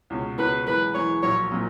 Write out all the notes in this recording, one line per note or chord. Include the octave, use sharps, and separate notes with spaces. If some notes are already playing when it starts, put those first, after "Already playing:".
C#2 B2 G#3 C#4
C#2 B2 G#3 C#4 B4
F#2 E3 G#3 B4
F#2 E3 G#3 C#5
A#1 A#2 F#3 C#5
A#2 F#3